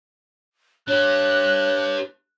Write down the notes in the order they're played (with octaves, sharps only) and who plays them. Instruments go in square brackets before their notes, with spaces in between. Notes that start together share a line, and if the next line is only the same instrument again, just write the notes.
[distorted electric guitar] D4 G4 [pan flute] C#5 [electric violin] F#6